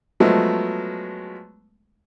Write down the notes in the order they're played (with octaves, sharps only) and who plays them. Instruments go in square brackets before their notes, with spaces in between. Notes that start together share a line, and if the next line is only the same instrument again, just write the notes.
[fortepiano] F3 F#3 G#3 A3 B3